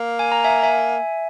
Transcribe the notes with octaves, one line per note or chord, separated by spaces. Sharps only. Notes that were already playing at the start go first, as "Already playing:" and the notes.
Already playing: A#3
G#5
A#5
E5 G#5
E5 G#5